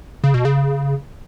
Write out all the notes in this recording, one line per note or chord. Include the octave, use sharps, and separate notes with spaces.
C#3
B2
C#3